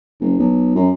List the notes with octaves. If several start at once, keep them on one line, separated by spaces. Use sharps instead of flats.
F#1
B1
F#2